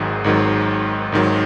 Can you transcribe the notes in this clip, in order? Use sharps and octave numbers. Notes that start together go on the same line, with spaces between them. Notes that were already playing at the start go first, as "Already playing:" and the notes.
Already playing: G#1 G#2 D#3 F#3 G#4
G#1 G#2 D#3 F#3
G#1 G#2 D#3 F#3